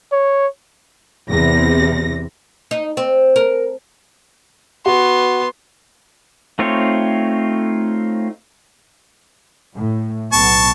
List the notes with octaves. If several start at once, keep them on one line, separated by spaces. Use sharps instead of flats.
C#5
E2 C3 A#6
D#4
C4
A#4
B3 F#4 C6
A3 C4 D#4 F4 C#5
A2
B1 B3 A5 C#6